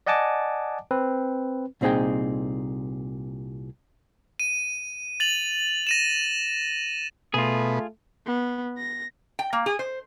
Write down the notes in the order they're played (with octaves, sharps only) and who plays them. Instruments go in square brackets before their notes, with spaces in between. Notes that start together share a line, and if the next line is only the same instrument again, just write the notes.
[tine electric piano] D5 D#5 F#5 G#5 A5 D6
C4 B4
[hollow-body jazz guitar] C2 A#2 C4 D#4 G#4 G5
[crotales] D#7
A6 F7 F#7
A#6 D#7 E7
[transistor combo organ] B2 [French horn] A3 [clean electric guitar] F4 G#4
[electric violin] B3
A#6
[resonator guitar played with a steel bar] G5
A#3
G#4
C5